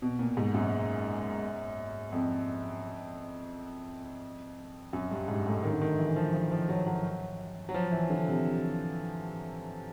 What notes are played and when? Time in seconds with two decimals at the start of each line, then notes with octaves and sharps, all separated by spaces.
0.02 B2
0.19 A#2
0.37 G#2
0.54 F#2
2.12 F2
4.93 F#2
5.11 G2
5.28 G#2
5.47 A2
5.63 D#3
5.73 D3
5.82 D#3
5.99 E3
6.16 F3
6.34 F3
6.52 F3
6.69 F#3
6.87 F#3
7.69 F#3
7.74 F3
7.92 E3
8.10 D3
8.28 C3